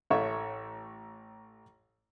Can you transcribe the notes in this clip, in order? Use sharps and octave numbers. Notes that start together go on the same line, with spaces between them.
A1 A3 C#5 E5 C#6